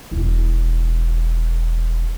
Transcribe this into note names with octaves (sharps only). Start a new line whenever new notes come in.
E1 E4